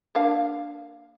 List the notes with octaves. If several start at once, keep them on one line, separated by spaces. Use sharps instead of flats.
A#3 D4 F5